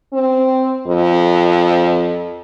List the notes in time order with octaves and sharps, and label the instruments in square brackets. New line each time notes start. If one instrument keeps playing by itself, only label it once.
[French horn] C4
F2